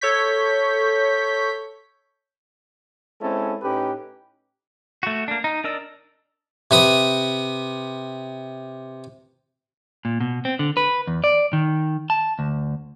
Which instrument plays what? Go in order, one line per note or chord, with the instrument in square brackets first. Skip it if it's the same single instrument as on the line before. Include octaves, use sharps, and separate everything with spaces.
[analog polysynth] A4 C#5 C#6 G6 B6
[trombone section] G#3 C4 C#4 E4 A4
A2 C#4 D#4 G4 B4
[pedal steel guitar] A3 F#4
A#3 D4
D#4
D4 A#4 D5 D#5 E6
[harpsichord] C3 B4 D#6
[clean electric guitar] A#2
B2
C4
D3
B4
E2
D5
D#3
A5
D2